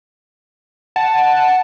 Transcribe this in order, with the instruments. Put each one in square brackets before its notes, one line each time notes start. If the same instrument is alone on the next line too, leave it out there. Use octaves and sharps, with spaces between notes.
[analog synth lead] F#5 [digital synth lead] A5